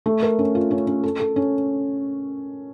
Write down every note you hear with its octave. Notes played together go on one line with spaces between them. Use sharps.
A3
A#4
C#4
F4
C#4
C#4
A4
A4
C#4